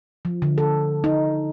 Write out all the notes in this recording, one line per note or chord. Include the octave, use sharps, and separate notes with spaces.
F3
D3
A4
D#4